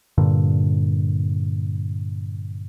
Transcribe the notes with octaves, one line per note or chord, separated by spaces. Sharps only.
G2 A#2 D3